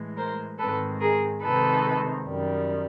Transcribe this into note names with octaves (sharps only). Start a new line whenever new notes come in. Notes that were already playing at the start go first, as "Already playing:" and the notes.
Already playing: A2 E3 G#3
A#4 C5
G#2 D#3 G#3 C4 A4 B4
G#4 A#4
C3 D#3 G#3 C4 D#4 A4 B4
F#2 D#3 G3